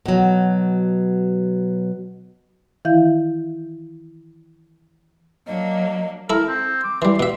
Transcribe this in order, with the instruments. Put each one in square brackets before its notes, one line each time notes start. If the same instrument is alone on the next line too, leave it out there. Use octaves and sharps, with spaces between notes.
[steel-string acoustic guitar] B2 F#3
[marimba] D#3 E3 E4 E5 F5 G6
[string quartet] F#3 A#3 D4 [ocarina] D#5
[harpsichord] E4 A4 [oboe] A#4
[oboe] C4
D6
[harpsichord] E3 G3 [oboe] C6
[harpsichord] B2 E5